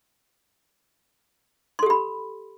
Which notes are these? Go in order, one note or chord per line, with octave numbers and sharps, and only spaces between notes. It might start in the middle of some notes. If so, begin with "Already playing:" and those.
G4 A4 B5 C6